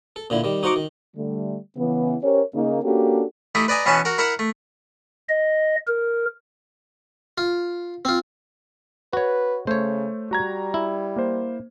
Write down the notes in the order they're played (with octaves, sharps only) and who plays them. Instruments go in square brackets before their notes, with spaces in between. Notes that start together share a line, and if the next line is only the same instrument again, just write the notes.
[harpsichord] A4
A#2 D3 E4
D#3 G3
D#4 F#4 C5 A#5 C#6 D6
D#3
[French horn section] D3 G3 A3
C#3 E3 B3
C#4 G4 A#4 C5 C#5
C#3 A#3 D#4
A#3 C#4 D4 F#4 G4 A4
[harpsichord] A3 D#4 E4 G4
B4 D5 D#5 G#5 A#5
B2 E3 B3 C#4 A5
F#4 A#4
E4 A#4 E5 F#5 A#5
A3
[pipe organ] D#5
A#4
[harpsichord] F4
C4 F4
[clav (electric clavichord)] F#4 C#5 [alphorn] B4
[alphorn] C#3 [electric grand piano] A3 [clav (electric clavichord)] C5 C#5
[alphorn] G3 [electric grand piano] F#4 A#5 G#6
[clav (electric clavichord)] E4
[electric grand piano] A#3 C5